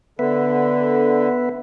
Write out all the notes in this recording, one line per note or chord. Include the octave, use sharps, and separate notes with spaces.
D3 B3 B4 E5